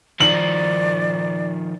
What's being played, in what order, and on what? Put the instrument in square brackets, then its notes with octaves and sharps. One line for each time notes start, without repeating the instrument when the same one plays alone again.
[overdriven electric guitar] D#3 F3 [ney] D5 [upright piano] F#7